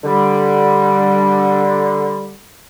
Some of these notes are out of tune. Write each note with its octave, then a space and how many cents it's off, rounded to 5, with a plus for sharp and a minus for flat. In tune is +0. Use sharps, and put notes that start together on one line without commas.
D3 +0 G3 +0